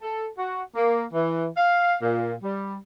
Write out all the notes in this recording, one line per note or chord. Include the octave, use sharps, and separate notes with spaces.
A4
F#4
A#3
E3
F5
A#2
G3